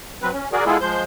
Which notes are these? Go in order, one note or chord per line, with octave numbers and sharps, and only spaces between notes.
F#3 C4 B4
C#4
F#4 G#4 A#4 D5
G#3 B3 E4 F4 G#4 A4
F3 G#3 C5 G6